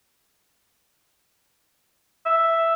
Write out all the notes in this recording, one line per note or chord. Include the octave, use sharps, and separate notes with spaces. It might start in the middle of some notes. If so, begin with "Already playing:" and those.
E5